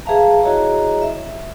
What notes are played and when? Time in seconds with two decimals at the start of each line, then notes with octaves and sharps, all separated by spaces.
0.05 G#4 B4 E5 F5 A5 A#5
0.43 E4 F#4 G#4 C#5 D#5 A#5
1.02 E5